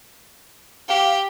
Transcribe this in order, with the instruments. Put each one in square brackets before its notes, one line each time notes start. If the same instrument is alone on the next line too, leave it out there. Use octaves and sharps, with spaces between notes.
[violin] G4 [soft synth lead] F5